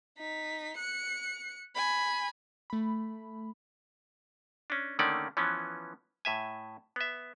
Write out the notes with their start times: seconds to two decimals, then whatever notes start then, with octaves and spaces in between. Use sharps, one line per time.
0.18 D#4 B6
0.78 F#6 C#7
1.75 G#5 B5
2.70 A3 B5
4.70 C#4 D4
4.99 D3 D#3 A3 A#3 C#4 D5
5.37 E3 F3 B3 C#4
6.25 A2 E5 G#5
6.96 B3 E5